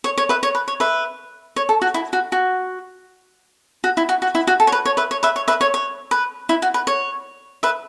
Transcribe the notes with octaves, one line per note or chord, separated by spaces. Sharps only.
C#5
C#5
B4 E5
C#5
B4
C#5
B4 E5
C#5
A4
F#4
E4
F#4
F#4
F#4
E4
F#4
F#4
E4
F#4
A4
C#5
B4
C#5
B4 E5
C#5
B4 E5
C#5
B4 E5
C#5
C#5
B4
E4
F#4
B4
C#5
B4 E5